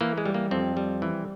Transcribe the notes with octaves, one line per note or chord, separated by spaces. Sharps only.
E3 A#3
G#3
G3
A#3
F2 C4
G3
E3